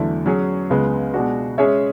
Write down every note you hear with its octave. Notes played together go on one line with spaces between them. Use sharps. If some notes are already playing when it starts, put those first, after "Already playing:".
Already playing: E2 D3 F#3 A3 E4
F#3 C#4 G#4
C#2 C#3 G#3 B3
B2 G#3 D4 F#4
G#3 C#4 G#4 C#5 E5